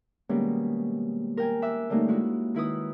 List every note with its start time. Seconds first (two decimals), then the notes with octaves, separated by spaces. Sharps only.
0.29 B2 D#3 G3 G#3 A#3 C#4
1.37 A#4 G5 G#5
1.62 E5 D6 F#6
1.90 D3 G3 A3 A#3 C#4 D#4
2.08 G#3 E4 F#4
2.54 D#3 E4 B4 D#6